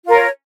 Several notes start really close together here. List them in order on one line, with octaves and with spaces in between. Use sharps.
F4 A#4 C#5